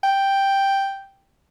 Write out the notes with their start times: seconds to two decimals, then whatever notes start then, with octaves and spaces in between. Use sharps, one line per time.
0.03 G5